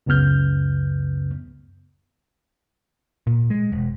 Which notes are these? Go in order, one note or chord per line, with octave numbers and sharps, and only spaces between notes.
C#2 F#2 C#3 B3 F6 G6
A#2
G#3
E1